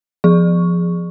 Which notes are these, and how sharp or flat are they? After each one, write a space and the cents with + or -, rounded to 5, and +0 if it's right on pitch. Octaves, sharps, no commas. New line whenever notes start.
F3 +0 G#4 +0 C#6 +0